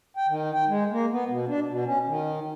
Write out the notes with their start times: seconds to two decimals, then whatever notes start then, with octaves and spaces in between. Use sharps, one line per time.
0.17 G5
0.28 D#3
0.54 G5
0.68 G#3
0.91 A#3
1.11 B3
1.28 B2
1.48 D4
1.67 B2
1.85 C#4
2.07 D#3